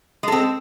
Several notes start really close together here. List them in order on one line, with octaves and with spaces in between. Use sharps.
G#3 A4 C4